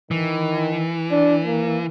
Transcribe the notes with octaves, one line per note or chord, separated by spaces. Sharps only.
D#3 E3
D4
A#3